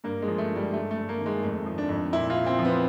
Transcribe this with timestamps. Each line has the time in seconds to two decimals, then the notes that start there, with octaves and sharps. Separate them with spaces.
0.04 G2 A#3
0.22 G#3
0.27 F3
0.38 A3
0.50 G2
0.56 G3
0.73 G2 A3
0.91 A3
0.97 G2
1.09 A#3
1.20 D#3
1.26 G#3
1.43 F2 A3
1.66 F3
1.78 D4
1.89 F2
2.13 A#2 E4
2.30 F4
2.35 A#2
2.46 C4
2.59 F3
2.65 B3